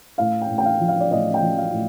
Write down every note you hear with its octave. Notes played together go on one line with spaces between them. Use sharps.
A2 F5
G5
A2
G5
F5
F3
F5
D5
A2 D#5
G5
F3
F5
A2